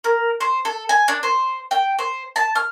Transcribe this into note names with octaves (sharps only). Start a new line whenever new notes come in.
A#4
C5
A4
G#5
D4
C5
G5
C5
A5
F6